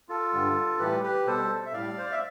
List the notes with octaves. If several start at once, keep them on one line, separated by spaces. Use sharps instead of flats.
F4 A4
G2 D3 G3
A2 E3 G3 G4 B4
G4 B4
B2 G3 A4 C5
E5
A2 G3 D5 F5
C5
D5
E5